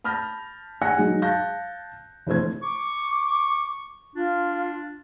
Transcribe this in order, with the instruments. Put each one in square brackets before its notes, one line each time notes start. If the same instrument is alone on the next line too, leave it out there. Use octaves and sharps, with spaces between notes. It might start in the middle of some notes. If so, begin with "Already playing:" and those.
[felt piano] A5 B5 F6 G6 A#6
F#5 G#5 F#6 A#6 C#7
F#3 G#3 D#4 G#4
F5 A5 F#6 G6 A#6
F1 E3 A3 C5 G#6
[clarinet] C#6 [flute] D6
[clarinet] D4 [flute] F4